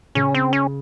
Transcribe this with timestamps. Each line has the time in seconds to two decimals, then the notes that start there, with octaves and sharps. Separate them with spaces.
0.15 C#3 C#4
0.35 C4
0.53 C#4